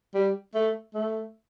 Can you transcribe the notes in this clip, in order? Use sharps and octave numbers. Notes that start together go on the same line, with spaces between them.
G3
A3
A3